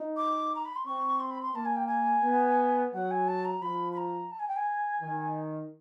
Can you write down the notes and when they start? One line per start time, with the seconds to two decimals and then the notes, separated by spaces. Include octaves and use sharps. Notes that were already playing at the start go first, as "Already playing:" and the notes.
Already playing: D#4
0.17 D6
0.55 A#5
0.65 B5
0.76 C6
0.86 C4 C#6
1.20 C6
1.31 B5
1.42 C6
1.55 A#3 A5
1.65 G#5
1.76 G5
1.87 G#5
2.24 B3
2.93 F#3 F#5
3.11 G#5
3.28 A5
3.45 A#5
3.62 F3 B5
3.93 B5
3.97 A#5
4.31 A5
4.39 G#5
4.48 G5
4.56 G#5
5.01 D#3